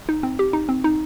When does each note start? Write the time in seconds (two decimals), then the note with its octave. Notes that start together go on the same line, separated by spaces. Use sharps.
0.09 D#4
0.23 C4
0.39 G4
0.53 D#4
0.69 C4
0.84 D#4